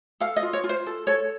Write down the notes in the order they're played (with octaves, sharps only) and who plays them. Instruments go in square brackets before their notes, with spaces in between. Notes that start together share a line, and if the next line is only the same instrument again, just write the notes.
[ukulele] A4 F5
D#5
F4
C#5
F4
C5
A4
A4 C#5